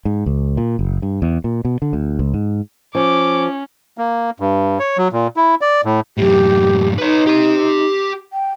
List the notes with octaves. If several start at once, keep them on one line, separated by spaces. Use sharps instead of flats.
G#2
C#2
A#2
F#1
G2
E2
A#2
B2
D3
D2
C#2
G#2
F3 C#4 D6
A#3
G2
C#5
F#3
A#2
E4
D5
A2
F#2 A2 G4
D#4 B4 C#5
G4 C6
G5